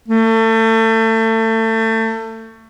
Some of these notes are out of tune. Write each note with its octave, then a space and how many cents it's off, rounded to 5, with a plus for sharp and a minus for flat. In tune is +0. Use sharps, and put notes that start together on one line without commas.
A3 +30